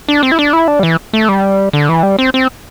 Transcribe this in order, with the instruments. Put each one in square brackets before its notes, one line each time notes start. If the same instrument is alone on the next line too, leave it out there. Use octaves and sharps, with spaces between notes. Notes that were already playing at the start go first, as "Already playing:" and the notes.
[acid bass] D4
C4
E4
D4
E4
D4
G3
E3
A3
G3
D3
E3
G3
C4
C4